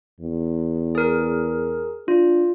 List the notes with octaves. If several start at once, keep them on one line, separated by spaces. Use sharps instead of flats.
E2
G#4 A#4
D4 F4